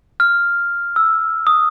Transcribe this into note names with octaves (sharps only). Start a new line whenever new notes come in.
F6
E6
D#6